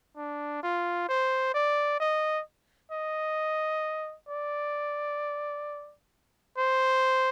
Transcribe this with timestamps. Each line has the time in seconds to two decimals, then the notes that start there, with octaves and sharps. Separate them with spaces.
0.17 D4
0.63 F4
1.09 C5
1.54 D5
2.00 D#5
2.92 D#5
4.29 D5
6.58 C5